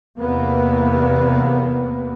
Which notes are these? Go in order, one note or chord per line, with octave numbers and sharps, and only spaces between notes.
E2 C3 A#3 B3